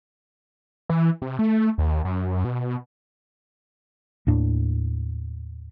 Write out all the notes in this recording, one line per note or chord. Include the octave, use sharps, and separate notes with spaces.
E3
C3
A3
D#2
F#2
B2
D#2 A2 D4